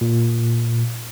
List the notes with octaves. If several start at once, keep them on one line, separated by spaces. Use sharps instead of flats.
A#2